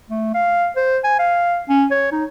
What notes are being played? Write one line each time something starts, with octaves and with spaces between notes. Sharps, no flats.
A3
F5
C5
G#5
F5
C#4
C#5
D#4